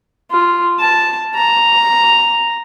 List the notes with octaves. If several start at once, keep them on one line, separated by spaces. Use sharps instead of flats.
F4
A5
A#5